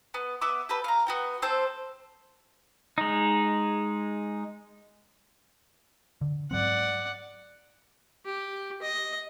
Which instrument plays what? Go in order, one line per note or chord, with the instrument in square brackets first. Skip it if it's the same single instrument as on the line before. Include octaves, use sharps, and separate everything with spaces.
[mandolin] B3
B3 E5 D6
G4 A4 B4
F5 A#5
B3 F#4 G5
C4 A4 C5 G6
[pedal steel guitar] G#3 D#4
[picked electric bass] D3
[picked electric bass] G#2 F#3 C4 [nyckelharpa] D5 F#5
[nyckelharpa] G4
D#5